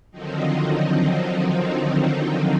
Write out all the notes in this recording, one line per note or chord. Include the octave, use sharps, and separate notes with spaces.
D3 D#3 F3 F#3 C4 D#4